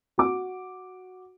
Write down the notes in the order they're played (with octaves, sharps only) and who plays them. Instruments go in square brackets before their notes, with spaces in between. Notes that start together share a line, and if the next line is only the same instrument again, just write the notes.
[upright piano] F#4 D6